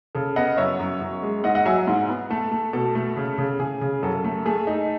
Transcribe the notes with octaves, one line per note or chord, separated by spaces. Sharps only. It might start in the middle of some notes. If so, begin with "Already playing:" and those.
C#3 A4
B3 D#5 F#5
F#2 C#5 E5
F#2
F#2
G#3
G#2 D#5 F#5
D#5 F#5
F#3 E5 G#5
G#2
B3
A3 A4
A3
B2 A4
A3
C#3
C#3
C#3 G#4
C#3
F#2 A4
A3
A3 G#4
D#4